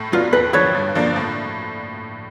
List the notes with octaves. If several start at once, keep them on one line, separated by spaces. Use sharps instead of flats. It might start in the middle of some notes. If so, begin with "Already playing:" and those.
Already playing: A2
F#3 B3 D4 F4
D#2 B4
D3 F3 B4 C#5
G2
D3 F3 A#3 D4
A2